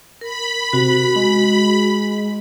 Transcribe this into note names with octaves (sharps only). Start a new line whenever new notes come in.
A#4 B5
C3 F#4
G#3